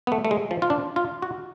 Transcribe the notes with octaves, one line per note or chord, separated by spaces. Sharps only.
B3
A3
A3
G#3
F3
F4
D4
F4
F#4